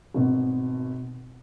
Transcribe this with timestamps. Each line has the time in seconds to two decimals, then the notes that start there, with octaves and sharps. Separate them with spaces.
0.14 G#1 B2